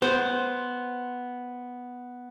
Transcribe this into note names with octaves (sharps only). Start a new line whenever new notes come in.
B3 C5